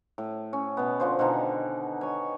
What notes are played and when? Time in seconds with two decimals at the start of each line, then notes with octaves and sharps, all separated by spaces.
0.18 A2
0.53 C#4
0.77 B2 B3
1.00 D3 F3 C5
1.19 B2 D3 D#3 G#5
2.01 C#5 G#5